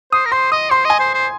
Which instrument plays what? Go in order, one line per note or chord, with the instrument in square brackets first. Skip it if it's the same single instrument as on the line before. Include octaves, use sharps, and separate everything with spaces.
[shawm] C5 [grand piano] D#6
[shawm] A#4
[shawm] C5 [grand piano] C6
[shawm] D#5 [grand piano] D#6
[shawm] C5 [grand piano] C6
[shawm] D#5 [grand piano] G#5
[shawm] C5
C5